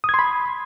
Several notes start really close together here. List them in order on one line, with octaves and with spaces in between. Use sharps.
D#6 G#6 C6 B5